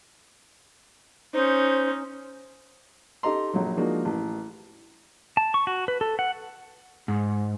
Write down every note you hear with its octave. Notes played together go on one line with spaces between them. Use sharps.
C#4 D#4 C5
D#4 G4 A4 D#5 A#5 C6
A#1 F#3
F3 G#3 A#3 D4 D#4 F#4
A1
A5
C#6
F#4
B4
A4
F#5
G#2